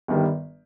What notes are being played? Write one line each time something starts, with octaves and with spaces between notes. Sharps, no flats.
G1 G2 D#3 G3